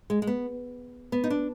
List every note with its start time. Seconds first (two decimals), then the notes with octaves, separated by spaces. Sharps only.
0.10 G#3
0.22 G#3
0.27 B3
1.12 B3
1.24 D#4
1.30 D4